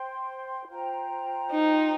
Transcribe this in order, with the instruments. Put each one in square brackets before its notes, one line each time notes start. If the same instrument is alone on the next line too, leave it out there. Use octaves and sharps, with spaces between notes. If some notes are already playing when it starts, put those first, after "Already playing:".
Already playing: [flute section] C5 G5 C6
F4 C5 G5 A#5
[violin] D#4